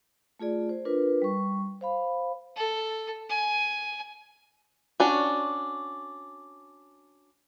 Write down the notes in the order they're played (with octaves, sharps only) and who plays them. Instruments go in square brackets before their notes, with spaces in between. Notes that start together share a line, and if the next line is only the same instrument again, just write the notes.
[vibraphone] A3 F4 G#4 D5
C5
D4 F4 A#4 B4
G3 C#6
C5 F5 B5
[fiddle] A4
G#5
[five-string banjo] C#4 D4 F#4